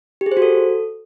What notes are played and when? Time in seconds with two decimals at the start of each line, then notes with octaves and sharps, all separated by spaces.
0.21 G4
0.26 G#4
0.32 C5
0.37 F#4
0.42 A4